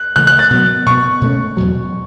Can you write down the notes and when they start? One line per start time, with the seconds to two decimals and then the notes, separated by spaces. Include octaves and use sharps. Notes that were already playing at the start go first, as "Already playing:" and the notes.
Already playing: F#6
0.16 C#3 E3 A3 F#6
0.27 F#6
0.39 A6
0.50 B2 F#3 B3
0.86 B2 B3 C#6
1.21 B2 A3 C#4
1.57 E2 B2 F#3